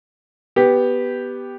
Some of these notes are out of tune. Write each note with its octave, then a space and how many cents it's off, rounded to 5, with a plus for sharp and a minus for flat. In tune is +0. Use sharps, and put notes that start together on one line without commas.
B3 +0 G4 +0